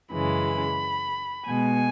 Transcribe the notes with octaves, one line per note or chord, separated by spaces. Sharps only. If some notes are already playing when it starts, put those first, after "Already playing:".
F#2 C#3 E3 G#3 B5
B2 G#3 G#5